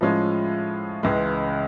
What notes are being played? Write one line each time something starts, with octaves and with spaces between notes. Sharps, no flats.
A2 F3 G#3 C#4 F4
C#2 C#3 E3 G#3